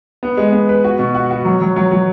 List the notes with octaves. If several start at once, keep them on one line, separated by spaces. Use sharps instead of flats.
B3
G#3
B3
B4
F#4
B2
F#4
F#4
F#3
F#3
F#3
F#3